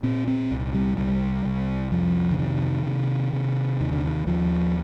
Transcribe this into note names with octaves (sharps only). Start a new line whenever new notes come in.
A#2 C4
C4
C2
G3
C2 G3
C2
F2 F3
D3
C3 D#3
C3
C3
D#2 D#3
D3
D#3
D#2 F3